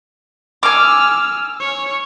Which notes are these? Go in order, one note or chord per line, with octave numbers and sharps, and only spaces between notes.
G#5 D6 E6 F6
C#5